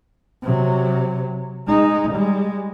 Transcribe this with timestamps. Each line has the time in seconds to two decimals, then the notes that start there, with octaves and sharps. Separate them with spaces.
0.43 C3 F#3
1.67 G#3 D#4
2.11 G3 G#3